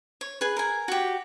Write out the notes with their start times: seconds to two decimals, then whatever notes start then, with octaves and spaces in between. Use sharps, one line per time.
0.21 C#5
0.41 G#4 B4
0.57 A#4 G#5
0.88 F#4 G4